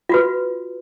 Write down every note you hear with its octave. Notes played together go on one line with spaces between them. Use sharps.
F4 F#4 B4